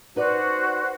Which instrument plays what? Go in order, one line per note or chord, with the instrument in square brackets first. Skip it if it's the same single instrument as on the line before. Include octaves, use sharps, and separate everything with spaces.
[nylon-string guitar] D#4 B4 D5 [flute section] F#4 C5